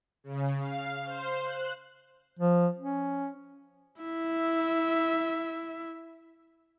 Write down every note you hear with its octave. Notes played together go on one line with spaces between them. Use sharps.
C#3
F5
C5
F#6
F3
C#4
E4 E5